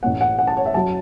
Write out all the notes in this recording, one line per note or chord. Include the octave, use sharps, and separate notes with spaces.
A1 A2 A3 C#4 F#5
F#5
F#5
A5
C#5
E5
F#2 F#3 C#4 A5